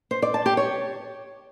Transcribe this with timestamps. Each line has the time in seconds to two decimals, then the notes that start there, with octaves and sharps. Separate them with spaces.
0.11 C5
0.22 D5
0.34 A5
0.46 G4
0.57 C#5